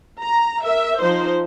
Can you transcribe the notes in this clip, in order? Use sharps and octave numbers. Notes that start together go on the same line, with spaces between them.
A#5
A#4 E5
F3 D#4 C5